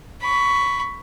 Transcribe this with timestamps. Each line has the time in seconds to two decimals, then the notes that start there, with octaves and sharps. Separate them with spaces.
0.21 B5 C#6